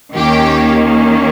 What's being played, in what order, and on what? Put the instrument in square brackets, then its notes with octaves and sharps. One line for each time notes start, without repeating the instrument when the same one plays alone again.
[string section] D#2 D#3 A#3 C#4 G4